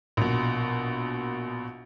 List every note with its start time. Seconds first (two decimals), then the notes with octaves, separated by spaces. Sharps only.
0.17 A#1 B2